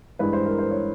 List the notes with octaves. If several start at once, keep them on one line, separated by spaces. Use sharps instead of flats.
G2 E3 G#3 B4
C5
A#4
C5
C#5